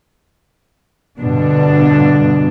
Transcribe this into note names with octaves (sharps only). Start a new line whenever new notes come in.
G2 B2 D3 D4